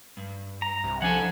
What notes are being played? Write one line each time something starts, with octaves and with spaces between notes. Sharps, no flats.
G2
A#5
C2
F3 D4 A4 F#5 G#5